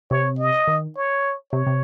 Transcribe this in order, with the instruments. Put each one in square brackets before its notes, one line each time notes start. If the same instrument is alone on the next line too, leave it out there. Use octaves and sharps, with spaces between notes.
[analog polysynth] C3 [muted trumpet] C#5
[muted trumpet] D#5
[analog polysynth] D#3
[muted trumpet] C#5
[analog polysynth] C3 [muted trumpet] C#5
[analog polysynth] C3